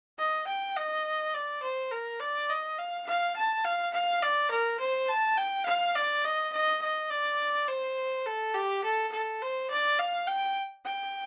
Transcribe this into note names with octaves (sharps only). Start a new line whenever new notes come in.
D#5
G5
D#5
D5
C5
A#4
D5
D#5
F5
F5
A5
F5
F5
D5
A#4
C5
A5
G5
F5
D5
D#5
D#5
D#5
D5
C5
A4
G4
A4
A4
C5
D5
F5
G5
G5